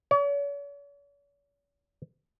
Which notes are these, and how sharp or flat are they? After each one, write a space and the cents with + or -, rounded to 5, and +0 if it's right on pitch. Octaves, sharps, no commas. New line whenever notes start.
C#5 +45